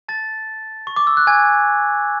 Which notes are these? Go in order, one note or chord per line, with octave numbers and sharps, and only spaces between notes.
A5 A6
C#6
D6
E6
F#6
G#5 G#6